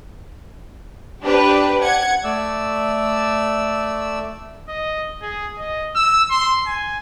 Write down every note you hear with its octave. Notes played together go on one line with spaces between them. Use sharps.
D4 G4 B4
F#5 G#6
A3 D5 E6
D#5
G#4
D#5
E6
C6
G#5